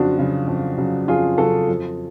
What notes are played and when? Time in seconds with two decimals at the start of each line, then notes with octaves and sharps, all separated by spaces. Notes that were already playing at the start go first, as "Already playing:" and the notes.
Already playing: F2 C#3 F#3 D4 F4 F#4
0.17 C#3 F#3
0.48 F2
0.77 C#3 F#3
1.08 F2 F4 G#4
1.38 C#3 F#3 F#4 A4
1.69 F2